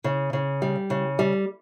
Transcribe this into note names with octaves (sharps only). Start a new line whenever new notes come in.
C#3
C#3
G3
C#3
G3